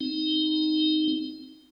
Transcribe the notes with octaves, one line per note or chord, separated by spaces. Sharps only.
C4 D#4